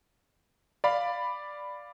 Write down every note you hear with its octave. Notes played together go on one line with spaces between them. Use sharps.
D5 F5 B5